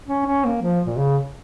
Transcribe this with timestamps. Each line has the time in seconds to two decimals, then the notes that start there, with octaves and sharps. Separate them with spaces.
0.08 C#4
0.26 C#4
0.45 A#3
0.62 F3
0.87 A#2
0.98 C#3